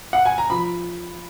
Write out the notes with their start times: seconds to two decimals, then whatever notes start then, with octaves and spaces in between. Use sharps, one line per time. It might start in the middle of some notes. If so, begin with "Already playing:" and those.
0.13 F#5
0.26 G#5
0.38 A#5
0.50 F3 B5